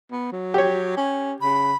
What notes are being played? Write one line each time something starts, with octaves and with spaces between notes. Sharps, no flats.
B3
F#3
G4 C#5
C#4
C#3 B5